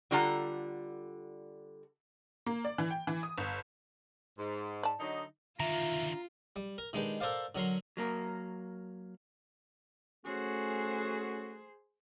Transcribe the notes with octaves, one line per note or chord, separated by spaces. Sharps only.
D3 G3 F4 A4 F#5 A#5
A#3
D5
E3
G5
E3
D#6
G1
G#2
D5 A5
D3 F#3 D#4
D3 D#3 F4 E5 A#5
G3
A#4
D#3 G#3 D4 G4 B4
A4 A#4 C5 D5 F5
D3 F#3 A#4 C6
F#3 A#3 A#4
A3 C#4 F#4 G#4 C5